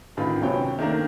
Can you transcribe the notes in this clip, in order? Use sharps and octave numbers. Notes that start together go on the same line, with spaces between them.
A1 D2 D#3 F4 B4 B5
F#2 C3 C#5 G5
D#3 A3 A#3 D4 A#4